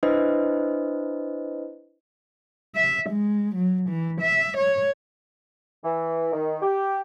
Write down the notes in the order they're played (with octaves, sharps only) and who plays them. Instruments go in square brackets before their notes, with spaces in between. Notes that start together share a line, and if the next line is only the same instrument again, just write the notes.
[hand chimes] D4 E4 B4 C5 D#5
[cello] E5
G#3
F#3
E3
E5
C#5
[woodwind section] E3
D#3
G4